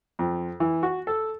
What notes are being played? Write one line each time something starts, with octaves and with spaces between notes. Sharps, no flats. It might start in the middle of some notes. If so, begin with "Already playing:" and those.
F2
E3
F#4
A4